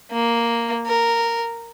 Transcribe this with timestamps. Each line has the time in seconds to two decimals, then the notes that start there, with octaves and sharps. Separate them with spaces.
0.12 A#3
0.86 A#4